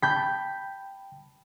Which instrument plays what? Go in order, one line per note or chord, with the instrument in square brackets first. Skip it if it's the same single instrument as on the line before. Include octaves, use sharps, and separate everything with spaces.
[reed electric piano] G5 A5 B5 [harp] G6 B6